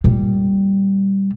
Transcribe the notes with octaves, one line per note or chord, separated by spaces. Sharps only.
A#2 G3